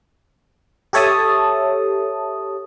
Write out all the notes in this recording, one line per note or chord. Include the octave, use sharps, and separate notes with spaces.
G4 A4 C#5 E5 A5 D#6